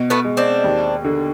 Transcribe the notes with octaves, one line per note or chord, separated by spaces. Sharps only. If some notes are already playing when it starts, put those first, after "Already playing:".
Already playing: B2
A3 B3
G#3
C4 D4
D#2
D3